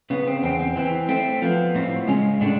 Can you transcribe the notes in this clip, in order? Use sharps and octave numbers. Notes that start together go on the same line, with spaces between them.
C#3 B3
C4
E2 C4
C4
E3 C4
A3 C4
F3 B3
A2 C4
C#3 G#3 C#4
A2 D3 D4